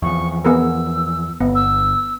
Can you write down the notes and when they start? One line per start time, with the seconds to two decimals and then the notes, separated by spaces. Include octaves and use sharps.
0.02 E2 F3 C#6
0.45 B3 G#4 A#4 E6
1.40 G1 B3
1.55 E6